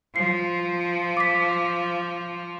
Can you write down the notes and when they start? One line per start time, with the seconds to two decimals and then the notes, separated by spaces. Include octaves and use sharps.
0.16 F3 C7
1.17 D6 B6